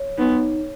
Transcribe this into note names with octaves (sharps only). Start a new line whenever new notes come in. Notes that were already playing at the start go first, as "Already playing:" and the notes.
Already playing: C#5
B3 D#4